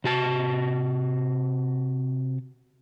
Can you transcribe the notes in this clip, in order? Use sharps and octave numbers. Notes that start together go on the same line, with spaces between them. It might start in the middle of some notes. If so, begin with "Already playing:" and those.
C3 F#4 A5